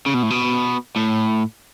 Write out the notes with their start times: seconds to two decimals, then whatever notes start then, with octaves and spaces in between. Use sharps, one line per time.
0.06 C#3
0.14 B2
0.23 A2
0.30 B2
0.96 A2